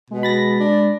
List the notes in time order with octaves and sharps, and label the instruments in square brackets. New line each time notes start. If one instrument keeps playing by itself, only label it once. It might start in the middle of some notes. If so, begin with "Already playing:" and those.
[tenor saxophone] B2 [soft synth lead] G#3
[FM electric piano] B5 A6 A#6
[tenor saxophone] D4